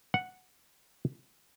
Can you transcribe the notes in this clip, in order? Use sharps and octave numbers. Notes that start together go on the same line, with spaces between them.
F#5